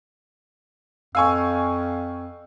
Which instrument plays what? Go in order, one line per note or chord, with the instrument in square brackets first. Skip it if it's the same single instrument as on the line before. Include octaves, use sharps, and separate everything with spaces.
[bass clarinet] F2 [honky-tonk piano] F5 G#5 C#6 [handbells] E6